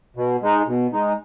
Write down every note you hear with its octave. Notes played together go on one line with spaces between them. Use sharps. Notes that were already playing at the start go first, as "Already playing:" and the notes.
B2
G#3 D#4
B2
G#3 D#4